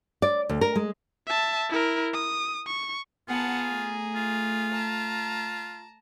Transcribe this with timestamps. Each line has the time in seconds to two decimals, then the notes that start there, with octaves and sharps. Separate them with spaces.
0.22 D5
0.49 D2
0.61 A#4
0.76 G#3
1.27 E5 A5
1.69 E4 A#4
2.13 D#6
2.67 C#6
3.28 B3 F4 G#4 F#5 A5 A#5
3.67 A3
4.15 F4
4.71 A5 A#5